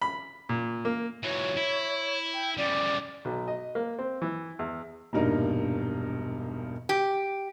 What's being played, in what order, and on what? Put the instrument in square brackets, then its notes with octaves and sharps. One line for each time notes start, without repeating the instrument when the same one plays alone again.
[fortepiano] B5
A#2
A#3
[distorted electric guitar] E3 F#3 [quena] C#5
[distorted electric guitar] E4
[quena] G5
[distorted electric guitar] C#3 G3 [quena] D5
[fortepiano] B1
D#5
A#3
C4
E3
E2
[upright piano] E1 A#1 G2 D#4 A#4 D#5
[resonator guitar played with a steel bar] G4